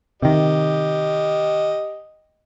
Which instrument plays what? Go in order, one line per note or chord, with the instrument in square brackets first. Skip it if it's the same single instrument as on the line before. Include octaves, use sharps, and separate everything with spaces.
[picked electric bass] C3 D#3 [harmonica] G4 D#5